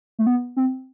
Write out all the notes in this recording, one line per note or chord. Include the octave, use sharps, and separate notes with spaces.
A3
B3
C4